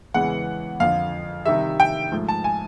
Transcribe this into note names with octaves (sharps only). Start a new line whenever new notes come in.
E2 C#3 E3 G#3 B3 F#5
F2 D3 F3 F5
C3 D#3 G3 E5
G5
G#2 F3 A3
A5
G#5